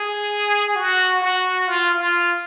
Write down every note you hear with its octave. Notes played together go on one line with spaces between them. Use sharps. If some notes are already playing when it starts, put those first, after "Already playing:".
Already playing: G#4
F#4
F#4
F4
F4